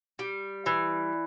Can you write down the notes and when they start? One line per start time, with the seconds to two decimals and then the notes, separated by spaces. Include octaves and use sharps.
0.19 G3
0.66 E3